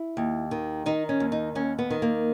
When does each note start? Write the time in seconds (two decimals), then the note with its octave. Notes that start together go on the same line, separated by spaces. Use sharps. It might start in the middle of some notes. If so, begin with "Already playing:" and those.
Already playing: E4
0.17 D#2
0.51 D#3
0.86 D#3 D#4
1.09 C#4
1.20 D#2
1.32 D#4
1.55 D#2 C#4
1.79 B3
1.90 D#3
2.02 A#3